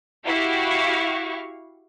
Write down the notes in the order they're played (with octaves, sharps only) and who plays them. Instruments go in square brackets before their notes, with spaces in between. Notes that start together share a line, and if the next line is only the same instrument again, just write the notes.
[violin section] E4 F#4 G4 F5 C#6